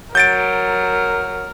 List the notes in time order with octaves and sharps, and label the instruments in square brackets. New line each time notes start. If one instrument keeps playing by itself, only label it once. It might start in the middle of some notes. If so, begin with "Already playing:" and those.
[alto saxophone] F#3 [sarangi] A#4 [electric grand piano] G6 A6 D7